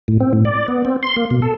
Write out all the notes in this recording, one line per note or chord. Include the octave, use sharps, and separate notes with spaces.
A2
C4
A2
D5
B3
C4
C6
A#3
B2
A4